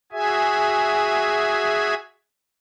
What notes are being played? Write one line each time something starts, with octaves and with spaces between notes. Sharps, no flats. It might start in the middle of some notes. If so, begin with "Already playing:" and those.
F#4 G#4 E5 G#5